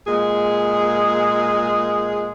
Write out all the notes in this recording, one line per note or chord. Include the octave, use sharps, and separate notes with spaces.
A#2 G#3 G#4